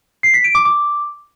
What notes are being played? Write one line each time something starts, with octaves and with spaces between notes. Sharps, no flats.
C7
B6
D7
D6
D6